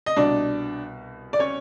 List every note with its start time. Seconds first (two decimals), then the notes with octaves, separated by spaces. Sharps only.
0.06 D#5
0.16 C2 B2 D4 D5
1.33 D5
1.39 C#4 C#5